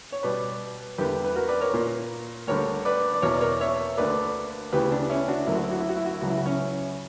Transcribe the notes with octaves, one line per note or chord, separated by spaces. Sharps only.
C#5
B2 G3 B3 B4 D5
E2 D3 G3 A#3 G4 B4
B4
F#4 A#4
B4 D5
A#4 C#5
A#2 A#3
D2 D3 G3 A#3 A#4 C#5
B4 D5
D5
E2 B2 A#3 A#4 C#5
D5
A#4 C#5
C#5 E5
D2 D3 A#3 B4 D5
D2 C#3 E3 B3 G4 B4
D4
C#4 E4
D4 F#4
D2 D3 F#3 A#3 E4
F#4
E4
F#4
E4
F#4
E4
F#4
E4
C#2 C#3 F#3 F#4
E4
F#4
C#4 E4